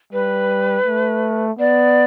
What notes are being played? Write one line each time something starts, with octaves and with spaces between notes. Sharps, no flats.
G3 B4
A3
B3 D5